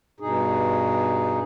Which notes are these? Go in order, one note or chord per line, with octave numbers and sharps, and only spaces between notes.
G2 B2 D#4 G#4